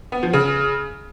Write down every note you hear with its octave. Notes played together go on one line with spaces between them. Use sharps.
B3
F3
C#3